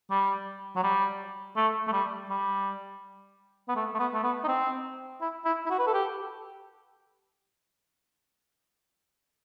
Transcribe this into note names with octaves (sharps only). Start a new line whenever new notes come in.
G3
F#3
G3
A3
A3
G3
G3
B3
A3
A3
B3
A3
B3
D#4
C4
E4
E4
E4
F#4
B4
A4
G4